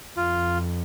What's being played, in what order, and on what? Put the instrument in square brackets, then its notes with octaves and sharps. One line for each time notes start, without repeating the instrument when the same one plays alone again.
[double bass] F2 [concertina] F4